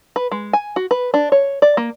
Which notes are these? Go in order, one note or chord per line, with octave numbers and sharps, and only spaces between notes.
B4
G#3
G#5
F#4
B4
D4
C#5
D5
A#3